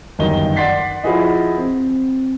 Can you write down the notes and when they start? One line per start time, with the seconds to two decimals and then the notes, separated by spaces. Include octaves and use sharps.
0.19 G1 F#2 D#3 D#5 G7
0.56 D5 F#5 C6 A6 B6 C7
1.04 F3 E4 F#4 G#4 D#5
1.57 C4